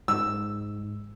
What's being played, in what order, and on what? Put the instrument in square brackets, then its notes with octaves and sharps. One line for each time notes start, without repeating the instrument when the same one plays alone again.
[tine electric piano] G#2 G#3 [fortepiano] E6